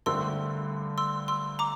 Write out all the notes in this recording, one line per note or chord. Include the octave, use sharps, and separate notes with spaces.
G2 D3 A3 C4 C6 E6
C6 E6
C6 E6
A#5 D6